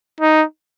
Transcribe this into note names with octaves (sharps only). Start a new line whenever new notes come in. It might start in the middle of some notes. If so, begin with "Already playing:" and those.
D#4